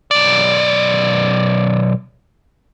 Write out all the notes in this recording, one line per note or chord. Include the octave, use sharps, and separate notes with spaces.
B1 D5